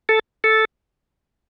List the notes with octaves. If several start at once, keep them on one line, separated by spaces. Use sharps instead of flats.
A4
A4